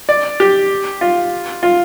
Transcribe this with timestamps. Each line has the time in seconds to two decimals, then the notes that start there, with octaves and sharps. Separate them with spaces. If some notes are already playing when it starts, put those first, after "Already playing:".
0.09 D5
0.40 G4
1.01 F4
1.63 F4